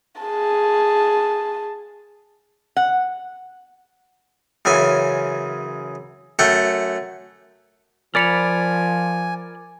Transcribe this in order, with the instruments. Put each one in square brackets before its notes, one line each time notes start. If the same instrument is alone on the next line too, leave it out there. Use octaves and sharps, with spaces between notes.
[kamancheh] G#4 A5
[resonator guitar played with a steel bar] F#5
[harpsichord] F#2 C#3 E3 G#5
F#2 A3 F#5 G5
[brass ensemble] F3 [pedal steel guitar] A#4 D5 B5 [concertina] G#5 [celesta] A6 C#7 F7